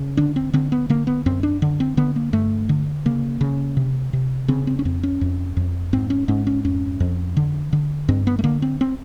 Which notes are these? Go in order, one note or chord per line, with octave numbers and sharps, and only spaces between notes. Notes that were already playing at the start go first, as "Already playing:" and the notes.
Already playing: C#3
D3 D4
C4
D3 C4
B3
D3 A#3
B3
F#2 C4
D4
D3
C4
D3 B3
A#3
G2 A3
D3
C#3 A#3
C#3
C3
C3
C#3 C4
C4
C#4
F2 C4
C#4
F2
F2
G#2 C4
C#4
G#2 C#4
C#4
F2 C#4
F2
D3
D3
G2 C4
B3
A3
D3 A#3
C4
C4